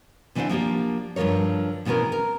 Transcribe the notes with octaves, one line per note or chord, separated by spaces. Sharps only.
C3 E3 C4 D4 C5 F#5
F3 A#3 D4 G4
G2 D3 F3 A#4 C#5
D2 B2 E3 B3 C#4 A#4
A#4